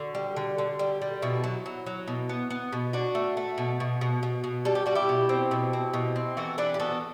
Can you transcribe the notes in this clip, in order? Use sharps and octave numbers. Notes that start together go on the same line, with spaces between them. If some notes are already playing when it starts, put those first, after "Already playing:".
Already playing: D3 F#4
G3
D3
D3
G3
G3
B2 E4
F#3
F#3
F#3
B2
B3
B3
B2
D4 F#4
A3
A3
B2
B2
B2
B2
B2
G3 A4
G4
G3 F#4
E4 G4
B2
C4
B2
C4
B2
C4
E3 F#4 A4
D4 G4 B4
G4
B3 F#4 A4